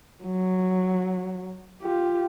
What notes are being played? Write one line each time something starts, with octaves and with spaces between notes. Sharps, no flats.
F#3
F4 G4